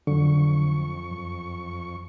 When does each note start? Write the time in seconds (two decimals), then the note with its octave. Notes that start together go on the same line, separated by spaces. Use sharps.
0.07 F2 D3 F#3 C#6
1.11 F#2